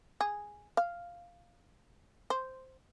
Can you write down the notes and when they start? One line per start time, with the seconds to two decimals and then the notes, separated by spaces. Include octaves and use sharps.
0.21 G#4
0.77 F5
2.30 C5